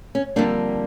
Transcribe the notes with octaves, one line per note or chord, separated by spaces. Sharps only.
C#4
F2 D3 G3 A#3 D4